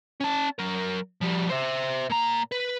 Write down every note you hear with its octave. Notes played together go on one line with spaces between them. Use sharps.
C#4 A5
F#3 A#4
F3 G3
C5 E5
A#2 A#5
B4